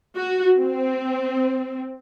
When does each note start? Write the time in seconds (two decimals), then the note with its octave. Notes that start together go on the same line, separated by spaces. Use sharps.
0.17 F#4
0.59 C4